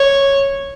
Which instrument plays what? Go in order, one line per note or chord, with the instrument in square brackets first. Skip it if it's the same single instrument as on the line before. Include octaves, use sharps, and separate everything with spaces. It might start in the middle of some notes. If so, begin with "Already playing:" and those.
Already playing: [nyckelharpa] C#5